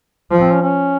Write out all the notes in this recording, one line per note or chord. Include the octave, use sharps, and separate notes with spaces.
F3
C4
C#4
C#4